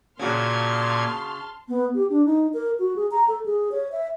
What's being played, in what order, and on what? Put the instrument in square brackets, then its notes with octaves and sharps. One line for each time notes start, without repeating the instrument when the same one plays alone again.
[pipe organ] A#2 G#6 [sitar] C#3 F#4 [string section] A5 C6 F6
[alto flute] B3
G4
D4
D#4
A#4
F#4
G#4
A#5
A4
G#4
C#5
E5